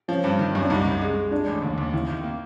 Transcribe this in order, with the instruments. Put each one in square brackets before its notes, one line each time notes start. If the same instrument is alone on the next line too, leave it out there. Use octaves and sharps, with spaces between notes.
[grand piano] F3 [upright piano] C#4
[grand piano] G2
D#3
[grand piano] F#2 [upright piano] C#4
[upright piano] D4
[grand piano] C2 [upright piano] D#4
[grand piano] C2
G#3
G#3
[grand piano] G#3 [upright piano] D4
[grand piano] A1
D#2
D#2
[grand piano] D#2 [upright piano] E4
[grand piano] D#3
A#3